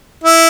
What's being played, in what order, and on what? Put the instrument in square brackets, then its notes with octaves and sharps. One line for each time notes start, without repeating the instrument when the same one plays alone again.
[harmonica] E4